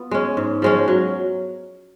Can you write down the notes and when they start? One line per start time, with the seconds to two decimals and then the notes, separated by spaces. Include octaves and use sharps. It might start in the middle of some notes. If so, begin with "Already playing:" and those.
Already playing: B3 F4
0.11 G#3 C#4
0.37 G#2
0.62 F3 G#3 C#4
0.88 F#3